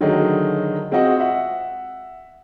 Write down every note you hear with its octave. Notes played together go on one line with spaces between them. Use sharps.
D3 D#3 F#3 G#3 A3 D#4
G#3 C4 F4 F#4 D#5 F#5
E5 F#5